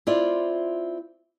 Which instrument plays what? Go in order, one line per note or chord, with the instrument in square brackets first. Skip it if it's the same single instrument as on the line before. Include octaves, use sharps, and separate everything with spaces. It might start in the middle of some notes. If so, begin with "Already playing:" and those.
[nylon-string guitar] C4 E4 F4 D5